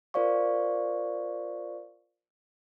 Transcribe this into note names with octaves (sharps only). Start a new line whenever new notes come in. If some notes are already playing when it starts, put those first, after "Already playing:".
F4 A#4 C5 D5 F5 C#6